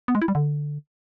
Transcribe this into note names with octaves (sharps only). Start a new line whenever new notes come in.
B3
G#3
E4
G3
D3